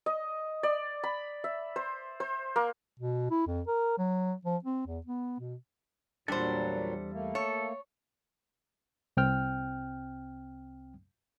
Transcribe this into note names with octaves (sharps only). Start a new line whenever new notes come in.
D#5
D5
B5
E5
C5
C5
A#3
B2
E4
F2
A#4
F#3
F3
C4
E2
B3
B2
E2 A#2 F#3 G3 D4 A4 C5
A3 A#3
A4 C#5
C2 C4 G5 F6